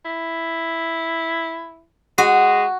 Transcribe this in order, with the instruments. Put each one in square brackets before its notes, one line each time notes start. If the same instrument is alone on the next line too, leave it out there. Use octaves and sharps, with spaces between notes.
[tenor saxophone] E4
[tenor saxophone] G#3 [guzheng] F#4